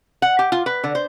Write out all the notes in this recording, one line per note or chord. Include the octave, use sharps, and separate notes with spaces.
F#5
G4
F4
B4
D3
C5